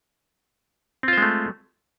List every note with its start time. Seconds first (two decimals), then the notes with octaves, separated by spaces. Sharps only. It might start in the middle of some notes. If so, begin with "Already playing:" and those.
1.03 C4
1.08 F4
1.13 C5
1.18 G#3
1.22 A3